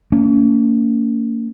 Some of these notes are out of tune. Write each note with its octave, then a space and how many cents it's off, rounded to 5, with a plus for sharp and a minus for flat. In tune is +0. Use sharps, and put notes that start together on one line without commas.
A#3 -30 C#4 +35